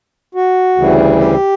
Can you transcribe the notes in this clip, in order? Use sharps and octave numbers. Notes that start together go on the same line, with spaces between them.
F#4
D2 C#3 E3 G3
G4